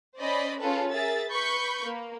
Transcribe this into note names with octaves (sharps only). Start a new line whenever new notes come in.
C#4 C5 D5 D#5 B5
C#4 F4 G#4 A4 B4
G#4 A#4 E5 A6
B4 B5 C#6 G6
A#3